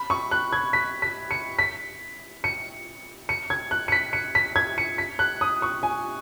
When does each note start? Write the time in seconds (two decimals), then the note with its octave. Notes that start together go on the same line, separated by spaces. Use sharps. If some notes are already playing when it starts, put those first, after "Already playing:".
Already playing: B5
0.10 C#6
0.31 F#6
0.53 G#6
0.73 B6
1.02 B6
1.31 C#7
1.59 B6
2.44 C#7
3.29 C#7
3.50 G#6
3.71 F#6
3.88 C#7
3.92 B6
4.13 C#7
4.35 B6
4.56 G#6
4.78 C#7
4.98 B6
5.19 F#6
5.41 D#6
5.62 C#6
5.83 G#5